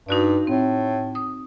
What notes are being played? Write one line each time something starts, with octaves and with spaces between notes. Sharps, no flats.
G2 D#4 F#4 D5
A2 C4
D#6